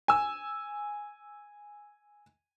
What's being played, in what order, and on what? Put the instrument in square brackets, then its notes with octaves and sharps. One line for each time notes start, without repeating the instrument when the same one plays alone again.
[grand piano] G#5 E6